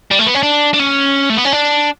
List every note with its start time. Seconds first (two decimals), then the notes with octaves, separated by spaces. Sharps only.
0.11 G3
0.19 A3
0.27 B3
0.35 C#4
0.43 D4
0.74 D4
0.79 C#4
1.30 A3
1.37 B3
1.45 C#4
1.53 D4